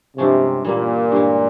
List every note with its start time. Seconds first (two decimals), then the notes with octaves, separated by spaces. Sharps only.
0.17 G2 C3 F3 G#3 C#4
0.65 A#2 E3 G3 A#3
1.12 G2 E3 G#3